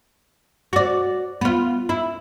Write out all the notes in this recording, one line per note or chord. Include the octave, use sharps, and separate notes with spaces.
F#4 D5
B3 F4
E4